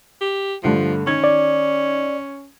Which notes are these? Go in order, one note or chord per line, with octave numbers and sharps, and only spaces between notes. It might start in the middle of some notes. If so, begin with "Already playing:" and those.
G4
G2 D3 F3 A3
D#3 C#4 G#6
D5